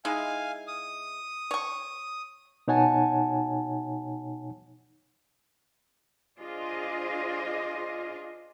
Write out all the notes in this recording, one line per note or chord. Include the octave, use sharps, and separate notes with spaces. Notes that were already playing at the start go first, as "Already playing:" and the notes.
G#3 D#4 E4 F5 G#5
D#6
C#5 C#6
B2 D#4 C#5 F#5 G#5 A5
D4 F4 G#4 C5 D#5